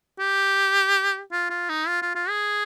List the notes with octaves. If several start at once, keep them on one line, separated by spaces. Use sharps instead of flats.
G4
F4
F4
D#4
F4
F4
F4
G#4